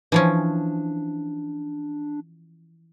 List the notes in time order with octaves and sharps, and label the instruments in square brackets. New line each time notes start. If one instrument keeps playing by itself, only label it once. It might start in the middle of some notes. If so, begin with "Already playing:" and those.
[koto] E3 F3 C#4 [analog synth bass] D4